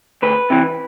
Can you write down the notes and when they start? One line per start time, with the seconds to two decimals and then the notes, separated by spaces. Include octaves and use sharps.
0.22 D2 B4
0.50 C3 E3